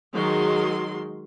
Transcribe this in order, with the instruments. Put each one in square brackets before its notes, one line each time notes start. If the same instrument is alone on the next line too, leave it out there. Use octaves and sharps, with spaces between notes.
[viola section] D#3 F#3 G#3 C6